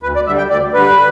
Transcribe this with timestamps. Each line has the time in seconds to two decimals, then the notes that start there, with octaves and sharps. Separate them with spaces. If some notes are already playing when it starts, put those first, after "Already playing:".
0.03 D2 B4
0.15 D5
0.27 D3 G3 E5
0.38 G5
0.49 D2 D5
0.74 D3 G3 B4